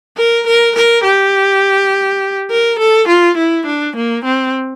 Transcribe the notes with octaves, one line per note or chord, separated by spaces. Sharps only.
A#4
A#4
A#4
G4
A#4
A4
F4
E4
D4
A#3
C4